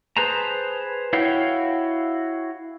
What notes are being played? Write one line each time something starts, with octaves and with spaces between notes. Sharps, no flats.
G#4 B4 C5 A5 A#5
E4 F#4 C#5 F5 G5